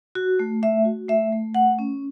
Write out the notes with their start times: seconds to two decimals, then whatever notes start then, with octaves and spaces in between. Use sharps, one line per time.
0.15 F#4
0.39 A3
0.62 A3 E5
0.85 F#4
1.08 A3 E5
1.32 A3
1.55 A3 F#5
1.79 C#4